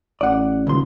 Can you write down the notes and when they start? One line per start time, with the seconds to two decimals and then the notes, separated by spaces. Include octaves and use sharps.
0.21 A1 D5 F#5
0.67 D#1 C#2 C6